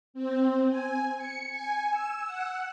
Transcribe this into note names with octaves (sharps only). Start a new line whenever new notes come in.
C4
G#5
C#7
G#5
E6
F#5